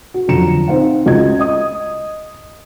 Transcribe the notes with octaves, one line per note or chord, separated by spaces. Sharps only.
F#4
F2 D3 F#3 A#5 C#7 E7
C4 D#4 C5 F5 F#5
C#2 F#4 D#5 G#6
D#5 D#6